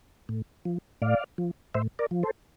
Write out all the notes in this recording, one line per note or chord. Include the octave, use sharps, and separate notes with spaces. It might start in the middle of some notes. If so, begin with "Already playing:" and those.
A2
F3
A2 D5 F5
F3
A2 C5 E5
A#4 D5
F3
A4 C5